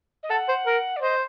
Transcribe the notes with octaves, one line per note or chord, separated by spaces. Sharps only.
D#5
A4 F#5
C5
A#4
D5
C5 D#5